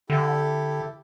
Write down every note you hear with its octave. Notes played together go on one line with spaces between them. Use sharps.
D3 E4 G4 A4